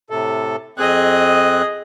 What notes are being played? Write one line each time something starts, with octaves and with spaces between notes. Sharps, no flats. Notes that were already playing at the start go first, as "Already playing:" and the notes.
A2 C3 A4
F2 C4 G#4 D#5 F#6